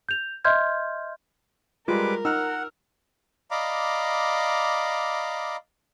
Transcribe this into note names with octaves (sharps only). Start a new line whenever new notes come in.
G6 F7
D#5 E5 C6 F6 G6 G#6
G3 G#3 F4 A#4 B4 D6
D#4 F#5 E6 F6
D5 D#5 F5 A#5 B5 D6